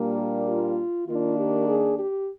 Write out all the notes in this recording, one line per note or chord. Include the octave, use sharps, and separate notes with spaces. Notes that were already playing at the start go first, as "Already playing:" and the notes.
Already playing: A#2 G3 A#3 D4
G4
F4
D#3 A#3 D4 F4
G4
G#4
G4